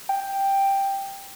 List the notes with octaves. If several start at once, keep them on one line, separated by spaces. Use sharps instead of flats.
G5